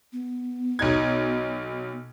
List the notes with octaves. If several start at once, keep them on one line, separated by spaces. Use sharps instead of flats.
B3
B1 D#4 G#6